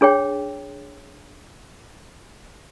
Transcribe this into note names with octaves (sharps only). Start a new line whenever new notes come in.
D4 G#4 C#5 G5